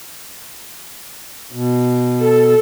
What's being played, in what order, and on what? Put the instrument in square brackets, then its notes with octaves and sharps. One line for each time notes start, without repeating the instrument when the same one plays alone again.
[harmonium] B2
[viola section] A4